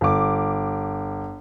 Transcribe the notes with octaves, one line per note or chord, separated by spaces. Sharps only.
G1 D6